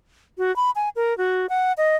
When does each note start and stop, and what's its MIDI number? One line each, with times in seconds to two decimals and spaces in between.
0.38 0.54 66
0.56 0.71 83
0.76 0.89 80
0.96 1.16 70
1.18 1.47 66
1.49 1.73 78
1.77 1.96 75